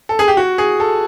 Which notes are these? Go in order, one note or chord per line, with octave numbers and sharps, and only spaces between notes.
A4
G#4
G4
F#4
G#4
A4